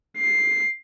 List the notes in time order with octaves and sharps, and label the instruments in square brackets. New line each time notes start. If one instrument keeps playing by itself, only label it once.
[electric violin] C7